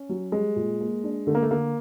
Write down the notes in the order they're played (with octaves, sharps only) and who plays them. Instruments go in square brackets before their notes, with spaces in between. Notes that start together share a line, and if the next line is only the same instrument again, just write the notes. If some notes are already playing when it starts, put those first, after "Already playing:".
Already playing: [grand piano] C#4
[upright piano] F#3
[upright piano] G3 [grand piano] G#3
[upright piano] A#2
A#3
D4
[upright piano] D3 [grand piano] A3
[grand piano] A#3
A3
[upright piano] D3 [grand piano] A#3